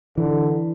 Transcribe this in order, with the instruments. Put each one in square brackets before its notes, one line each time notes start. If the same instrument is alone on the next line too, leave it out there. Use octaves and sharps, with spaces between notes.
[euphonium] D3 [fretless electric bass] E3